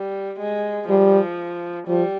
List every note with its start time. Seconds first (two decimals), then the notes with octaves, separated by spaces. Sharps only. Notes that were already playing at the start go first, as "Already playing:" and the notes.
Already playing: G3
0.40 G#3
0.90 F3 G3
1.88 F3 G3